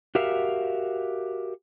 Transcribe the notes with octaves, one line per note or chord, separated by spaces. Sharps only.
F#4 G4 A#4 E5 F5